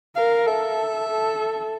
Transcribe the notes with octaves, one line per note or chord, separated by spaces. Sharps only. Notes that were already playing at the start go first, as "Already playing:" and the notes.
A#4 F5
A4 E5
A4